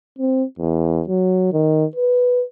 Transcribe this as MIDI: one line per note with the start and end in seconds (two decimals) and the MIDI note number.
0.18 0.44 60
0.59 1.03 40
1.08 1.48 54
1.53 1.85 51
1.95 2.44 71